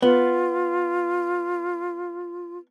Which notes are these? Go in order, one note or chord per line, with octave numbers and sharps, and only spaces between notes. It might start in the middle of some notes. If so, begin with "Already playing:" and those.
B3 F4